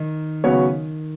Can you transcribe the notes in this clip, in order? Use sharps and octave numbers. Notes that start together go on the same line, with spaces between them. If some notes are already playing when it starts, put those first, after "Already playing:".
Already playing: D#3
C#3 F#3 B3 F#4 C#5